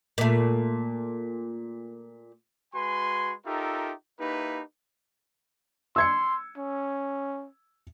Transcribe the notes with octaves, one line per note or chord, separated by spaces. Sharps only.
A#2 A3
G#3 F#4 B4 G#5 C6
D#4 F4 G4 A4 A#4 E5
A#3 D#4 E4 G4 B4
C6 E6 G#6 C#7
C#4